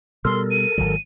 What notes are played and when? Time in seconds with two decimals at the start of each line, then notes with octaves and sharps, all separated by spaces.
0.25 B2 G3 A4 A#4 C6
0.51 D#7
0.78 G#1 D#3 F#3